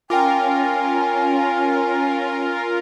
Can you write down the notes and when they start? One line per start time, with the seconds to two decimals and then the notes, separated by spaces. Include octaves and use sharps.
0.10 C#4 F4 A#4 G5 G#5 D6